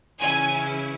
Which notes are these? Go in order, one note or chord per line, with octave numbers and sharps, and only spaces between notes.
C#3 E3 C#4 E4 G#5